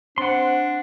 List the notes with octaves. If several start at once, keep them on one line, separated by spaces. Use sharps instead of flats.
C4 D4 F#5 C6